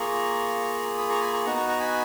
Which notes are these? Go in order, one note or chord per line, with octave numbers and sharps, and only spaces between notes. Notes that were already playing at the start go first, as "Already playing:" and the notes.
Already playing: A#3 F4 G#4 A#5 C#6
B5 D#6
A#5 C#6
G#5 B5
A#5 C#6
B3 D#4 F#4 A#5 C#6
A#5 C#6
A#5 C#6
G#5 B5